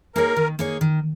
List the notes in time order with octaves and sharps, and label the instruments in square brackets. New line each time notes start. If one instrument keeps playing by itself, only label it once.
[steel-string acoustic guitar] A#3 D#4 G#4 C#5 [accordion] A#4
[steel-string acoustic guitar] D#3
A#3 D#4 G#4 C#5
D#3